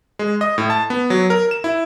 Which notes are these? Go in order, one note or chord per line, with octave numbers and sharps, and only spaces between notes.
G#3
D#5
A2
A5
B3
F#3
A#4
E7
E4